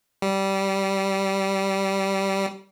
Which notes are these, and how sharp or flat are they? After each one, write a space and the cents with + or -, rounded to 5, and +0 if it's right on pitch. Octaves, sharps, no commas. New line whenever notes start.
G3 -15